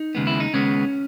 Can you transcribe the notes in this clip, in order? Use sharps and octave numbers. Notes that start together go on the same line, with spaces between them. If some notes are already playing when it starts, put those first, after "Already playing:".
Already playing: D#4
D#2 C#3 G#3 B3
E4
D#4
D#2 C#3 G#3 B3 C#4